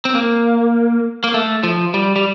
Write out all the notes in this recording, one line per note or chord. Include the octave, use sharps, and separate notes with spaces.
C4
A#3
A#3
A3
F3
G3
G3